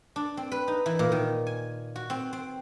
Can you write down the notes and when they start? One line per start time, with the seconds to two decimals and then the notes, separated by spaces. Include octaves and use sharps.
0.16 D4
0.37 C4
0.52 B4
0.68 D#4
0.86 E3
0.99 A#2
1.12 D#3
1.47 G#5
1.96 F#4
2.10 C4
2.33 C4